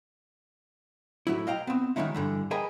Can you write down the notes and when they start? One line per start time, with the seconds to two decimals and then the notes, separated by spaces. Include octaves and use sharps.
1.27 A2 F#3 E4
1.47 D#5 F5 G5 A#5
1.67 B3 C4
1.96 D#3 E3 F#3 G#3 D#4 E4
2.15 G2 D3 E3
2.51 G#4 A#4 B4 D#5 G5 G#5